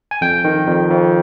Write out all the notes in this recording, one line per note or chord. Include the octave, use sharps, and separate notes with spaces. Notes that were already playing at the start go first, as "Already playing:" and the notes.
G#5
F2 G5
D#3
F2
F2